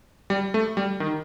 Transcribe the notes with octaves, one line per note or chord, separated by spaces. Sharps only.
G3
A3
G3
D#3